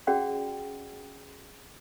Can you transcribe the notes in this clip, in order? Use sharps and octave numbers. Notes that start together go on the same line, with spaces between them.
C#4 F#4 G#4 D5 F#5 G5